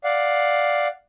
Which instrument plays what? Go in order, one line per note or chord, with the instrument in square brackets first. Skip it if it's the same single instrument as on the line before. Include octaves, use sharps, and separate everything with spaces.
[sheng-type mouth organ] D5 F5 F#5